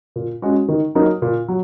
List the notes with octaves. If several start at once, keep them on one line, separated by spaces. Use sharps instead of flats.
A#2
G#3 C#4 F#4
D#3
F#3 A#3 D#4
A#2
F#3